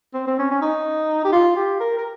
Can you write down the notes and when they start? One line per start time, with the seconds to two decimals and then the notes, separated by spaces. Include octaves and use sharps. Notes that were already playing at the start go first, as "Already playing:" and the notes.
0.14 C4
0.27 C4
0.39 C#4
0.51 C#4
0.62 D#4
1.24 G4
1.32 F4
1.56 G4
1.80 A#4
1.98 A#4